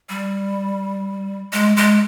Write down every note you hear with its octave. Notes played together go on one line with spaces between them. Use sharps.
G3
G#3
G#3